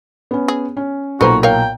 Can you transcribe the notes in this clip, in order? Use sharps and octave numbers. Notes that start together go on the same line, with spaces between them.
B3 C#4
G#4
C#4
B1 A#2 F#4 A4 B4 C5 A#5
A#4 C#5 F5 G5